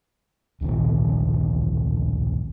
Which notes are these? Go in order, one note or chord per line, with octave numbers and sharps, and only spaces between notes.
D1 A#1 C3 D#3